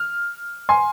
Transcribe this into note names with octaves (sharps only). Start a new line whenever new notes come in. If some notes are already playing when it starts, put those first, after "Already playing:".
Already playing: F6
G#5 C6